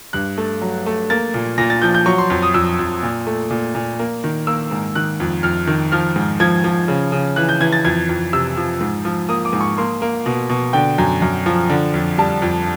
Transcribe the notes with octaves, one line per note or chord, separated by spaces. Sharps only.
G2 F#6
A3
F#3
A3
A#3 A6
A#2
A#2 A#6
A6
F3 G6
G6
F#3 C#6
C6
F2
D#6
F2 E6
F2
A#2
A3
A#2
A#2
A#3
D#3
A#3 E6
G#2
D#3 F#6
F2
F2 F6
D#3
F3 F6
G#2
F3 G#6
F3
C#3
C#3
E3 F#6
G6
E3 G#6
A6
F2 G#6
F2
C3 E6
F3
G#2
F3
A#3 D#6
D6
G#2
C#6
A#3 C6
A#3
B2
B2
D3 G5
F#2
F#2
F3
D3
F2
G3 A5
F2